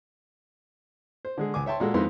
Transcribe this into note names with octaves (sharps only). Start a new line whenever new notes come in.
C5
D3 G#3 G#4
C#2 G#5 D6
C#5 E5 G5 A5 C6
A#2 G#3 F#4 A4
F2 D#3 G#3 E4 B4 C6